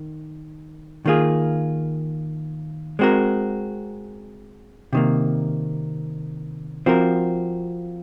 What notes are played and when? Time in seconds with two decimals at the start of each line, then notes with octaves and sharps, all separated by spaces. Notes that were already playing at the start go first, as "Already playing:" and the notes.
Already playing: D#3
1.06 D#3 A#3 F4 G#4
2.99 G#3 C4 F#4 A#4
4.93 C3 D#3 A#3
6.86 F3 C4 F#4 A#4